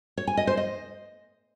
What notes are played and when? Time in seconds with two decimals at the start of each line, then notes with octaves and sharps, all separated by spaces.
0.17 C#5
0.27 G#5
0.37 D#5
0.47 C5
0.57 D#5